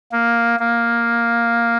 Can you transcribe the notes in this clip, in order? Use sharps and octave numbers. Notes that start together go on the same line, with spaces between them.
A#3
A#3